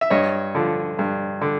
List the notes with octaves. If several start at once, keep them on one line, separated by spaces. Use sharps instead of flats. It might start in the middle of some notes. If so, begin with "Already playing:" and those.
E5
G2 C#5 D#5
D3 F3
G2
D3